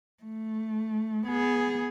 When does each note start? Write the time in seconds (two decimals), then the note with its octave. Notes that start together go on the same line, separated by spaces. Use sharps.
0.23 A3
1.26 B3 G#4